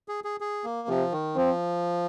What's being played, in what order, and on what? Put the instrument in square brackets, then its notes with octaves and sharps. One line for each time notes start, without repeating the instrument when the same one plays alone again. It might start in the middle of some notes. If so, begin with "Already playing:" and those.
[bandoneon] G#4
G#4
G#4
A#3
[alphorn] C3 [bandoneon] F3
[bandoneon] D#3
[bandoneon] F3 [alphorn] C4